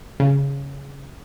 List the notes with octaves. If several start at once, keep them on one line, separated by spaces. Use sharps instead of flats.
C#3